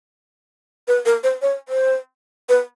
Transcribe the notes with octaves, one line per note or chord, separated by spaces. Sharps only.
B4
A#4
C5
C#5
C5
B4